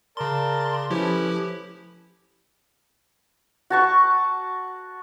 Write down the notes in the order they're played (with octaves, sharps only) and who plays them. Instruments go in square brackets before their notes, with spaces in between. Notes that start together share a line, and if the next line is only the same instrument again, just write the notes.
[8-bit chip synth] C#3 C6 [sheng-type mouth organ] A#4 D5 A5
[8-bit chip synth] F3 E4 G4 [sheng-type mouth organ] A3 C#4 B4
[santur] F#4 A5 C#6